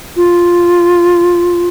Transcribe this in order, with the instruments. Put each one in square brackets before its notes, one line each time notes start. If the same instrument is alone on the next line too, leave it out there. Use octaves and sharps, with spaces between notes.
[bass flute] F4